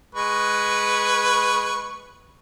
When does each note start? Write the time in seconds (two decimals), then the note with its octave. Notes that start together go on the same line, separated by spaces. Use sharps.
0.15 G#3 B4 C#6